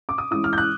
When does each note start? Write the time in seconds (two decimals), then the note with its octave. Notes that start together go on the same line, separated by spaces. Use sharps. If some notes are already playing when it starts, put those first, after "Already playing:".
0.09 D6
0.18 D#6
0.31 E3 G#3 C#4 E4 D#6
0.44 F6
0.53 G6
0.58 F#6